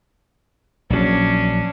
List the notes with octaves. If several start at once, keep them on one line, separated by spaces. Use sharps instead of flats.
A#1 F#3 C#4 D4